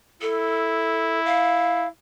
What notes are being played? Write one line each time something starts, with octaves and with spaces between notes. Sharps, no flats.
E4 A4
F5